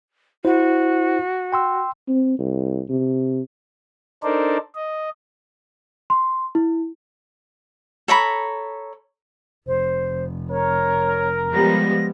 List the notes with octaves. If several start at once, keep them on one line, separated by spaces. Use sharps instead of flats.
E4 F#4 C5
G5 C6 E6
C4
C2
C3
D4 D#4 A4 A#4 C5 D5
D#5
C6
E4
A4 C#5 A#5 B5
F1 C5
A#4 C#5
F3 G3 G#3 B3 A#6